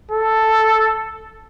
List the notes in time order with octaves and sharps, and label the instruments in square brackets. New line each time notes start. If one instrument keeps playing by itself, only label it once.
[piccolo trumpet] A4